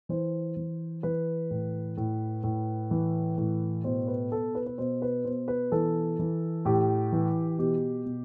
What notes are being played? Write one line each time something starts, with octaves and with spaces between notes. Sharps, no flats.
E3 C5
E3
E3 B4
A2
A2
A2
E3
A2
B2 C5
B4
B2 A4
B4
B4
B2 C5
B4
B2 C5
B4
E3 A4
E3
A2 G4
E3
B2 G4
B2